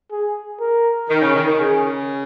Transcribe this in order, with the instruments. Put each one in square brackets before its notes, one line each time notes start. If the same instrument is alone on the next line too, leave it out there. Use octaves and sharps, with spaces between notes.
[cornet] G#4
A#4
[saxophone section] D#3
C#3
D#3
D#3
[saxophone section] C#3 [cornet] G#4